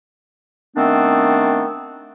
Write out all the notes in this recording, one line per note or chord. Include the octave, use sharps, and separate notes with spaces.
D#3 A3 B3 C4 D4